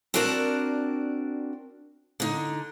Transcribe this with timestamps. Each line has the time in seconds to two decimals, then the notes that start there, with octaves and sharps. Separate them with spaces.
0.14 C4 D4 F#4 A#4 D5 A5
2.20 D3 D#4